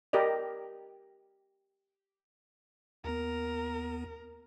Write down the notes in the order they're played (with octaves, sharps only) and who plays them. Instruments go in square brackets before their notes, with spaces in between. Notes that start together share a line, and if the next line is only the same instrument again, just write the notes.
[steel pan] G4 A#4 D5 D#5
[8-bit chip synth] D#2 B3 [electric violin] A#4